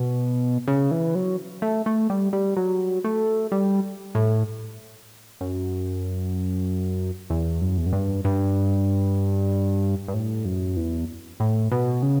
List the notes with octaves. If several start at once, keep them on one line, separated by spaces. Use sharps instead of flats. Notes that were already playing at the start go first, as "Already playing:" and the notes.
Already playing: B2
C#3
E3
F#3
A3
A3
G3
G3
F#3
A3
G3
A2
F#2
E2
F#2
E2
F#2
G2
G2
G2
A2
F#2
E2
A2
B2
C#3